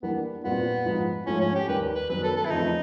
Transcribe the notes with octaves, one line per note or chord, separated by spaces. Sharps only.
E3 G3 A#3 B3 D4
A#2 G3 B3 C4 F4
G#2 F3 G#3
G#2 F3 A3 C#4
C#4
G4
D#2 D#3 G3 B4
B4
F#2 D#3 G3 B3 B4
A4
A4
E4
E2 C#3 F3 A3 C4 D#4